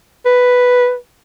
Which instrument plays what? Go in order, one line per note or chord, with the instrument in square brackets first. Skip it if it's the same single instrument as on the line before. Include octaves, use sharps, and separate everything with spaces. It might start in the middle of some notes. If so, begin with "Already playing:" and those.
[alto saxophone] B4